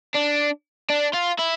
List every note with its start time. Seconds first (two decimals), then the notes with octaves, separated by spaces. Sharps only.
0.15 D4
0.89 D4
1.13 F4
1.39 E4